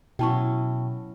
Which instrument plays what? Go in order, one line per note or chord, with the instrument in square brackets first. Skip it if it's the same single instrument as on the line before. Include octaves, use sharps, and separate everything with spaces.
[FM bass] B2 [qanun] F#3 C#4 E4 [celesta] G5 A5 C#6